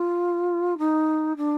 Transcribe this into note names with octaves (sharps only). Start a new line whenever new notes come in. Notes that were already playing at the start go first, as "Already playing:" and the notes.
Already playing: F4
D#4
D4